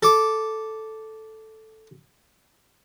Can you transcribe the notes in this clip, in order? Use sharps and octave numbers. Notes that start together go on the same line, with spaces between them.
A4 D6